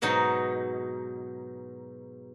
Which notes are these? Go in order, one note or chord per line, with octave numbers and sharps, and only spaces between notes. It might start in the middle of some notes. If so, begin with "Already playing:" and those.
G#2 B2 F#3 D#4